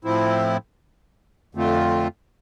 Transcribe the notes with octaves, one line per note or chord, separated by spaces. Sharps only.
A2 F3 C4 E4
F2 D3 A3 C4 F4